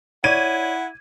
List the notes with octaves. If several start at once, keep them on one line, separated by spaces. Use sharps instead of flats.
E4 C#5 D5 F#5 G#6 D#7